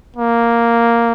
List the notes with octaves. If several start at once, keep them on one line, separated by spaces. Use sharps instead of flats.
A#3